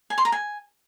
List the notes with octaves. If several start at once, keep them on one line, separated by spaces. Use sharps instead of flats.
G#5
C6
A#5
G#5